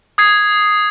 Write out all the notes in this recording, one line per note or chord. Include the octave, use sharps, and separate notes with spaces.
D#6 G#6 C7